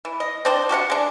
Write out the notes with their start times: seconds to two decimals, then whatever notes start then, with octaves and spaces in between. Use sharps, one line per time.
0.05 E3
0.20 D#5
0.45 C4 D4 C5
0.69 F#4 G4 A#4 F#5
0.90 G#3 D4